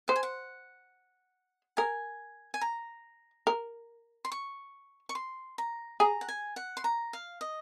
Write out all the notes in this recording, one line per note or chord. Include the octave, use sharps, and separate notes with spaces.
C5 F#5
G#5
F#5
A#4 G#5
G#5
A#5
A#4
C6
C#6
C#6
C6
A#5
G#4 A#5
F#5
G#5
F#5
C6
A#5
F5
D#5